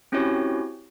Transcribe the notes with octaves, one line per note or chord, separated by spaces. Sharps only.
C4 C#4 E4 F#4 G4 C#5